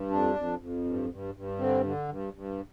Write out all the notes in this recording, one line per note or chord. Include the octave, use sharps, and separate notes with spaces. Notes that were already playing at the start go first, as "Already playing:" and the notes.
Already playing: G2
F2 D4
F2
F2
G2
G2
G2
D3 C4
D3
G2
G2